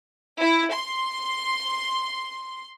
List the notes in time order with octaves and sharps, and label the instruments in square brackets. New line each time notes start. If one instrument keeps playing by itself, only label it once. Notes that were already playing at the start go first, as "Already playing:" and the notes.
[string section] E4
C6